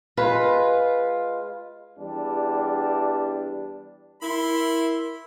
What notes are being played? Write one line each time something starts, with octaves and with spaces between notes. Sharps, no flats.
G#3 F4 B4
E2 G3 D4
E4 A#4 B5 C6